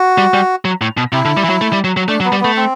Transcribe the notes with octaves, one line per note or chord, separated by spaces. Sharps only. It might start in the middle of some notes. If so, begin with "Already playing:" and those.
Already playing: F#4
G3
G3
F#3
A2
B2
C3 E4
D3
G3
E3
F#3
A3
G3
F#3
F#3
A3 D4
F#3
B3
G3
A3 B3
C4